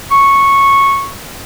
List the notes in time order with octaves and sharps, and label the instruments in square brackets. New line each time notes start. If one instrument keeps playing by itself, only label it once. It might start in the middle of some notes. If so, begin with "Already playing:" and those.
[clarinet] C#6